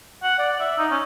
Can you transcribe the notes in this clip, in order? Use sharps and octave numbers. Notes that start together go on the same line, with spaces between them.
F#5
D5
E5
D#4
C#4